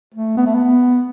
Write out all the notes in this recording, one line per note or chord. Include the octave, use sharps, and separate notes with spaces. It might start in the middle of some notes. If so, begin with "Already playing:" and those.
A3
B3
A3
B3